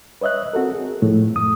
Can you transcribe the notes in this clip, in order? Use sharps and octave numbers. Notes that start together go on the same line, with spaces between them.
B4 C#5 D#5 E5 F#6
C4 F#4 A4 A#4
G#4
A2 F3 A3
F#2 D#6